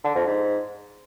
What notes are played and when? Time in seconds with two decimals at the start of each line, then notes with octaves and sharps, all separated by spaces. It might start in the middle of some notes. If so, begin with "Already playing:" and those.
0.04 D3
0.15 F2
0.26 G#2